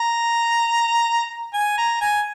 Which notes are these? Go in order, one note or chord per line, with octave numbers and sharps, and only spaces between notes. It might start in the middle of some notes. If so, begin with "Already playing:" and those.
Already playing: A#5
G#5
A#5
G#5